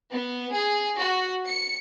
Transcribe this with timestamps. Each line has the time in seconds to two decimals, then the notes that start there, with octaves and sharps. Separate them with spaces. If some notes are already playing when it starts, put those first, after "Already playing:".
0.12 B3
0.53 G#4
0.97 F#4
1.47 C#7